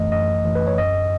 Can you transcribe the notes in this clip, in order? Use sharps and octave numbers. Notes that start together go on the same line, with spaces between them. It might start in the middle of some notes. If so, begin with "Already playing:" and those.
Already playing: F#2 E3 A3 D#5
F#2 D#5
E3 A3
B4
C#5
F#2 D#5